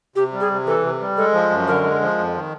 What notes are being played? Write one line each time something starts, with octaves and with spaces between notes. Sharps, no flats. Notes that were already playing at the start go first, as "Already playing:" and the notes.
C3 G4
G3
G#4
C3
E3 A4
C3
G3
G#3 A4
F3
F#2
D3 A#4
G#3
F3
F2
D#3